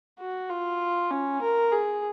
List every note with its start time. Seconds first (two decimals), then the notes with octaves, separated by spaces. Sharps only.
0.20 F#4
0.50 F4
1.11 C#4
1.42 A#4
1.72 G#4